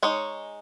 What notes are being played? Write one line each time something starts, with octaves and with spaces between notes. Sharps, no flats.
G#3 D#4 C#5